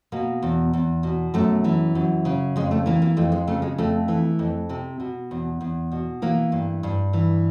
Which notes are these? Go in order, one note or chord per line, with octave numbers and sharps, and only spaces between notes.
B2 A#3
E2
E2
B2
F#2 A3
E3
F#2
C#3
F2 G#3
A3
E3 A#3
A#3
F2 A3
G#3
C#3 A3
G#3
F2 A3
E3
F2
C3
B2
E2
E2
B2
E3 A#3
G2
G2
E3